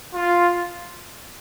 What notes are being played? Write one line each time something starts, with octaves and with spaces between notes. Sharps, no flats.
F4